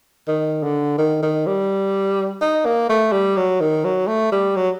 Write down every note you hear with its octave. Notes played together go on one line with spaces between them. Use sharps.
D#3
D3
D#3
D#3
G3
D#4
A#3
A3
G3
F#3
D#3
F#3
A3
G3
F#3